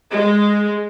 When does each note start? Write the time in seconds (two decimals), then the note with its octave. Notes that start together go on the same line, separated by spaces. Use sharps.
0.12 G#3